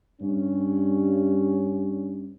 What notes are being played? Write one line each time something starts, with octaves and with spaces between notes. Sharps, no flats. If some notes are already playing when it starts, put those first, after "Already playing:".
G2 C#4